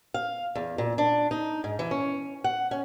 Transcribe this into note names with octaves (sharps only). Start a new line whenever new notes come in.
F5
E2
A#2
D4
D#4
G#2
E3
C#4
F#5
C#4